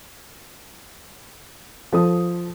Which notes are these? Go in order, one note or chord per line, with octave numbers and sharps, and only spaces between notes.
F3 A4 D#6